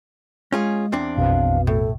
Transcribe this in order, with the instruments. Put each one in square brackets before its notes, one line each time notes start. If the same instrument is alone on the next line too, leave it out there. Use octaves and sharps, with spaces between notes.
[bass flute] G#3 [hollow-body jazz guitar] C#4 F4 G#4
[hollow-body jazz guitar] E2 C4 D4
[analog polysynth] A#1 F2 B2 [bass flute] F5
[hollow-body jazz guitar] A2 [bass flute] A4